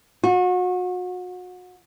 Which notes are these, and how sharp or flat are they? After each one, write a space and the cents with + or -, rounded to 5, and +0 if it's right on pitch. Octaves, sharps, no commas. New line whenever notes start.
F#4 -35